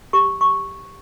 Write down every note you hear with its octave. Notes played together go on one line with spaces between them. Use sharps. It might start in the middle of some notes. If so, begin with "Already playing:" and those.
G4 C#6
C#6